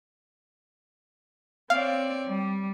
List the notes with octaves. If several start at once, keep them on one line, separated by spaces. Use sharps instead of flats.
C4 C#5 D5 F5
G3